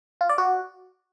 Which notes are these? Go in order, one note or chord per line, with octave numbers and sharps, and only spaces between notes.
F4
D5
F#4